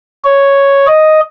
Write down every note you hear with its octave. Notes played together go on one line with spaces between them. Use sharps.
C#5
D#5